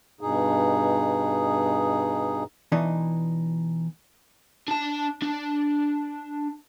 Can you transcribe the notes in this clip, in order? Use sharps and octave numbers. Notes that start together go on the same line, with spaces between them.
G2 B2 D#4 G#4
B2 E3 D4 D#4
D4 A5
D4